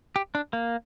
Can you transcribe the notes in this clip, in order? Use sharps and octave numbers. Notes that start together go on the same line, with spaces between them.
G4
D4
A#3